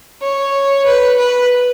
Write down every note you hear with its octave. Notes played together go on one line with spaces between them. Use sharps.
C#5
B4
B4